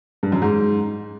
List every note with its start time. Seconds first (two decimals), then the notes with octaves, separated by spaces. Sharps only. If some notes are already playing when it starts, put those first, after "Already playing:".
0.23 G2
0.32 F#2
0.42 G#2